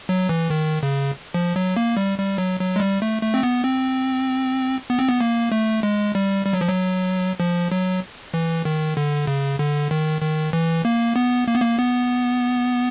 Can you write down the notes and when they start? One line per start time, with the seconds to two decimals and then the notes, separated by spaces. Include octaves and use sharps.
0.09 F#3
0.29 E3
0.50 D#3
0.83 C#3
1.34 F3
1.56 F#3
1.77 A#3
1.97 G3
2.18 G3
2.38 F#3
2.60 F#3
2.76 G#3
2.80 G3
3.02 A3
3.22 A3
3.34 C4
3.43 B3
3.64 C4
4.90 B3
4.99 C4
5.08 B3
5.21 A#3
5.52 A3
5.83 G#3
6.15 G3
6.46 G3
6.53 F#3
6.61 F3
6.68 F#3
7.40 F3
7.72 F#3
8.34 E3
8.65 D#3
8.97 D3
9.27 C#3
9.59 D3
9.91 D#3
10.21 D#3
10.53 E3
10.85 A#3
11.16 B3
11.48 A#3
11.54 B3
11.62 A#3
11.79 B3